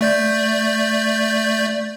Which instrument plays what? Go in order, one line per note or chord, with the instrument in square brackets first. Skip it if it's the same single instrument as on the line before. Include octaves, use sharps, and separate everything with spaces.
[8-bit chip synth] A3 D5 G6